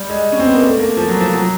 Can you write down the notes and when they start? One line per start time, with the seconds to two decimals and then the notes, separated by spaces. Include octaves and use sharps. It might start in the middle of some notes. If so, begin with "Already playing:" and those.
Already playing: G3
0.10 G#3
0.32 C#4
0.40 C4
0.47 B3
0.55 A#3
0.62 A3
0.79 A#3
0.97 F3
1.08 F#3
1.20 F3
1.33 F#3